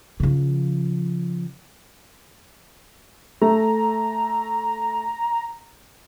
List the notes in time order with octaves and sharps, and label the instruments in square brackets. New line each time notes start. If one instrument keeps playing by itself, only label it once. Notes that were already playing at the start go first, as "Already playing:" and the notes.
[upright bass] C#3 F3
[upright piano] A3 [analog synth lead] A#5